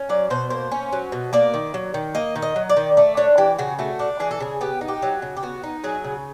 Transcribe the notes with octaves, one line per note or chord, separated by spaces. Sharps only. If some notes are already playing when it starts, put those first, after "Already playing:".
Already playing: C#4
F#3 D5
B2 C5
A#3 C5
C#4
F#3
B2
A#3 D5
D#3
F#3
D#3
A#3 D#5
D#3
D#5
F#3
D5
D#3
A3 D5
D4 C#5
E3 G4
C#3 F#4
A3 F#4
D4
E3 G#4
A4
C#3 G#4
B3 G4
D#4
G4
F#3
C#3
G4
B3 F#4
D#4
F#3 G#4
C#3